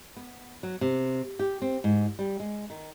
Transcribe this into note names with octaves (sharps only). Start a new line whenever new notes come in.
B3
F#3
C3
G4
C4
G#2
G3
G#3
D#3